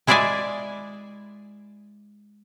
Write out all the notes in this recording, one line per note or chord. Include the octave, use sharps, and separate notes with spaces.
G#3 E4 G#4 D5 E5 G#5